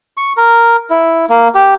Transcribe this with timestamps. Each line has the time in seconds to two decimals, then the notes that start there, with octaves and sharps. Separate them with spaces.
0.17 C#6
0.37 A#4
0.90 E4
1.29 A#3
1.55 G4